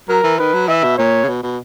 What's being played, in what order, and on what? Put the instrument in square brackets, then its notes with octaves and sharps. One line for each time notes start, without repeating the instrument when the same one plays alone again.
[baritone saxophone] F#3 [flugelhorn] A#4
[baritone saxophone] E3
[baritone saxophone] D#3 [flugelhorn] B4
[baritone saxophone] F#3
[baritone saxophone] E3 [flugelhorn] E5
[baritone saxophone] B2
[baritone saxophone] A#2 [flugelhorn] C#5
[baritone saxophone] C#3
B2
B2